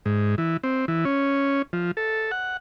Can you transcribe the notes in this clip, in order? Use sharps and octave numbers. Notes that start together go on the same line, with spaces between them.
G#2
E3
C4
E3
C#4
F3
A4
F#5